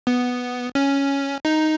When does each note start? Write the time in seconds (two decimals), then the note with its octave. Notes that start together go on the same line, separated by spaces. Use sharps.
0.07 B3
0.75 C#4
1.45 D#4